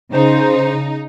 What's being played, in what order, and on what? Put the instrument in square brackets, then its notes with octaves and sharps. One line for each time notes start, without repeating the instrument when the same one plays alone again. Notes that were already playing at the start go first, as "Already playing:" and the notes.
[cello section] C#3 [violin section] D#4 [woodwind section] C5